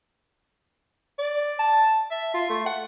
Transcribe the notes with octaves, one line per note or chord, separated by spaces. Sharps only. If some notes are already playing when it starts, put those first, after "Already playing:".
D5
A5
E5
F4
A3
F#5